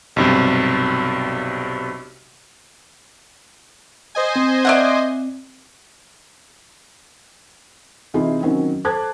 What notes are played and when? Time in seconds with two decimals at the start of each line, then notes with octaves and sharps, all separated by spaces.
0.16 B1 G2 C3
4.15 C5 D#5 G#5
4.36 C4
4.65 D5 E5 F#5
8.14 C3 E3 D#4 F4 G#4
8.42 D#3 F#3 C4 C#4
8.84 A4 C5 A5 D6 F#6 G#6